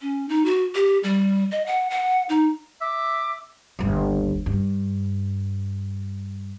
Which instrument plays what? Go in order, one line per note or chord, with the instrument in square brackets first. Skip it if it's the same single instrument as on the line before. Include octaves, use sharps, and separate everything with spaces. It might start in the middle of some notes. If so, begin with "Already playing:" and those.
[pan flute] C#4
D#4
F#4
G4
G3
D#5
F#5
F#5
D#4
[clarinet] E5 [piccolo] D6
[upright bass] G1 D#2
G2